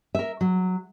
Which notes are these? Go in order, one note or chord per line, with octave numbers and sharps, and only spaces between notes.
A#4 E5
F#3